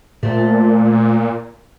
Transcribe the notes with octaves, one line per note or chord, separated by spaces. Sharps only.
A#2 A3 C4